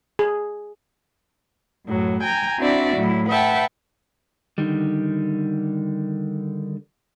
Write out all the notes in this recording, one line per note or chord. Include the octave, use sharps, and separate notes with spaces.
G#4
F#2 A2 F#3
G5 G#5 A#5
C4 D4 E4 F#4 D5 E5
A2 F#3 E4
B4 E5 F#5 G5 A5
D3 D#3 G3